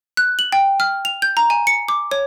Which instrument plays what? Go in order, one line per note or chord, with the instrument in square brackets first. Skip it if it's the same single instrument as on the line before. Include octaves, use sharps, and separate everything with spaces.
[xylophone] F#6
F#7
G5
F6
F7
G6
A#5
G#5
C#7
D6
C#5